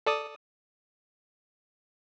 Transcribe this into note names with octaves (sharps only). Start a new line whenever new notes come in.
A4 D5 D#6